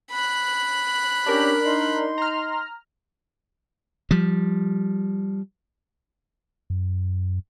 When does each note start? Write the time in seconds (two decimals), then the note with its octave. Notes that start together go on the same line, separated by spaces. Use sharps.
0.11 B5 F#6
1.26 C#4 D4 G4 A#4
1.64 D#4 C6
2.18 A#5 F6
4.11 F3 G3
6.70 F#2